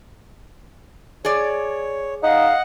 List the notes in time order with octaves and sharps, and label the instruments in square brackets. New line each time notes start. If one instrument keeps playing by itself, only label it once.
[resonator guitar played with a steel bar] G#4 D5 [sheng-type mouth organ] C#5
[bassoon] D#4 [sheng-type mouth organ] D#5 F#5 [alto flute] F5